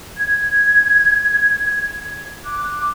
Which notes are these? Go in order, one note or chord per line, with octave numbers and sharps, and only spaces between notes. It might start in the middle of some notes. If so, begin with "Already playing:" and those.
G#6
D6 F#6